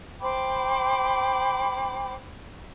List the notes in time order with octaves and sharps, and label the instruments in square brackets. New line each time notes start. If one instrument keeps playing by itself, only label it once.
[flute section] C5 G5 B5 D6